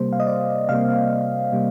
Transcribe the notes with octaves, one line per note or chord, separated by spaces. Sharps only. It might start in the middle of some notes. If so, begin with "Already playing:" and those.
Already playing: C3 G3 A#3 C5
F5
D#5
D5
C3 G3 A#3 F5
C3 G3 A#3